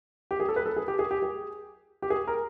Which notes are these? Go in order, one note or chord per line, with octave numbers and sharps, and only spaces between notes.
G4
G#4
A4
B4
A4
G#4
G4
G#4
G4
G#4
G4
G#4
A#4